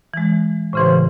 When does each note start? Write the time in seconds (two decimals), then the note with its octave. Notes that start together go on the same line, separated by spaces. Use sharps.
0.14 E3 G#3
0.73 A1 A2 C#3 E3 C5